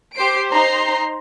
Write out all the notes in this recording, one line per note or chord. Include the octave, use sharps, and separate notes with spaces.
G4 C5 C7 D7
D#4 C5 G5 A#5 C6 C7